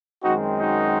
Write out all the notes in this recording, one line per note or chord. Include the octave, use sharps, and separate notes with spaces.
F#2 D#3 G#3 C4 D#4 F#4
D#4 F#4